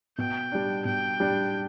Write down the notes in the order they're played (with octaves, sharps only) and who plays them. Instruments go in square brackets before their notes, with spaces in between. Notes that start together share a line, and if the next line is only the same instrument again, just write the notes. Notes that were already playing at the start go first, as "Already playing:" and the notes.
[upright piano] B2 [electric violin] G5
[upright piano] G3 D4
[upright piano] B2 [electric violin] G5
[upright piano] G3 D4